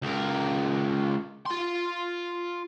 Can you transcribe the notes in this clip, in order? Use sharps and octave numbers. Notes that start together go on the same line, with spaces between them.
C#2 A#4
F4 C6